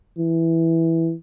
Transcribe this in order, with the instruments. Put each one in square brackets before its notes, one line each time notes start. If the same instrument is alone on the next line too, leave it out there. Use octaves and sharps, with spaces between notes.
[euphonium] E3